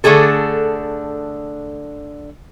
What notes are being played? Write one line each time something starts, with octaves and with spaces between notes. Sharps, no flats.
D3 A3 D4 G#4 A4